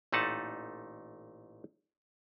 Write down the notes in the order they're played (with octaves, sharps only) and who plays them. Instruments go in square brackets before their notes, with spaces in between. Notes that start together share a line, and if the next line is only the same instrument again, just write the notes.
[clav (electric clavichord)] A1 A#2 A3 D#4 F#5 A5